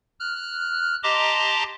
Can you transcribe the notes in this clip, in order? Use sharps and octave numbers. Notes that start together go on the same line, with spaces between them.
F6 F#6
G4 D#5 A5 A#5 C6 D6